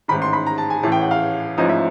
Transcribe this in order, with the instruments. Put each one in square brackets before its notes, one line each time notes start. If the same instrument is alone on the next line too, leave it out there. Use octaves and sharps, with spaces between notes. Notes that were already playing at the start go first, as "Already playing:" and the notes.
[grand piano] A1 G#2 D#3 B5
C6
B5
A#5
A5
G#5
A1 A2 E3 A5
G5
F#5
F5
A1 G#2 F3 D#5
E5